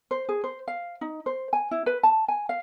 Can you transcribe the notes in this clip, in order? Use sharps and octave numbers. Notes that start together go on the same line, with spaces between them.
C5
G#4
C5
F5
D#4
C5
G#5
E4
B4
A5
G#5
F5